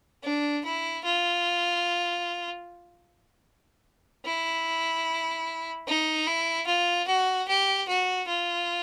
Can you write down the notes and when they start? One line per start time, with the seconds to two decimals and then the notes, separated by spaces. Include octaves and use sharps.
0.24 D4
0.65 E4
1.05 F4
4.26 E4
5.87 D#4
6.27 E4
6.67 F4
7.08 F#4
7.48 G4
7.88 F#4
8.28 F4